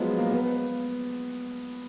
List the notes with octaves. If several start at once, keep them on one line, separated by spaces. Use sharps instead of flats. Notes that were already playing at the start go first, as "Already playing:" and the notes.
Already playing: F3 F#3 G#3 B3
A#3
B3